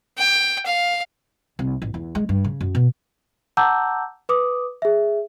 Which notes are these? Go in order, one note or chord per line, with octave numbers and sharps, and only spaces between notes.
G5
F5
C2
A1
E2
G#3
G2
C#3
F#2
B2
F#5 A5 A#5 D6 E6 G6
B4 D6 D#6
G#4 E5